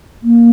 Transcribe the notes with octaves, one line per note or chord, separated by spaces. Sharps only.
A#3